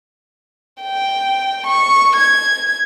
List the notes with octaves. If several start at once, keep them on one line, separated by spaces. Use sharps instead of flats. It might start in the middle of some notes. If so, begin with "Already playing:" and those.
G5
C#6
G#6